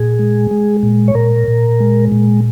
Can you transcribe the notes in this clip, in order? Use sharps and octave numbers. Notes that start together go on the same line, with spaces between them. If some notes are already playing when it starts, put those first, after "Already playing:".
Already playing: A#2 G#4
G#3
G#3
A#2
C#5
A#2 A#4
A#2
G#3
A#2